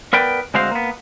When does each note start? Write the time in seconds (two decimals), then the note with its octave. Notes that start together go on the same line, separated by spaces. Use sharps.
0.13 B3 A#4 B4 D5 G5
0.54 D2 G#3 C4 F#4 C5 F5
0.71 A#3 B3